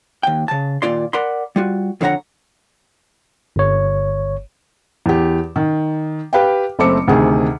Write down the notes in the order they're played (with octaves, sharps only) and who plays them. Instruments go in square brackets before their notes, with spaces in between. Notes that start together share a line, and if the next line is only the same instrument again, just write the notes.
[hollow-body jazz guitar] D#2 G5
C#3 A5
D#2 A#2 F4 D5 C6
A#4 D5 F#5 B5 C6
G3 F4 F#4
F2 D3 C#5 F#5 A#5
[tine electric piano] G1 C#5
[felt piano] E2 G4
D#3
G4 B4 F5 G5
F#1 A3 C4 D6 C#7
D2 C3 D#3 G#4